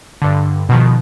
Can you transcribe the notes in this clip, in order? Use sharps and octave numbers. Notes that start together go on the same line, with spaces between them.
G2 D3
B2 D#3 F3